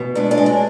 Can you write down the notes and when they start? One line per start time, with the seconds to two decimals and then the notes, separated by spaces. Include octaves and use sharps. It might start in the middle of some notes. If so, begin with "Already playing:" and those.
Already playing: B2
0.15 G#3 D4
0.31 D4
0.38 G#3
0.46 D4